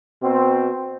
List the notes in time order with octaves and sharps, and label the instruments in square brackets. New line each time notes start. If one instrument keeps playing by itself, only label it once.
[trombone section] B2 C4